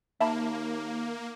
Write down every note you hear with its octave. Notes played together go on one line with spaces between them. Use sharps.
D#2 A#3 E5 A5 B5